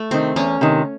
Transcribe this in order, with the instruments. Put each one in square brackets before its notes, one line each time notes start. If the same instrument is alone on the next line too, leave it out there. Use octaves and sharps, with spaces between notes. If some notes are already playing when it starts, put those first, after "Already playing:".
Already playing: [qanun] A3
[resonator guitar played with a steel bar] C3 D#3 [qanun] C4
[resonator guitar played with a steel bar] E2 [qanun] C#4
[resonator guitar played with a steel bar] C3 D#3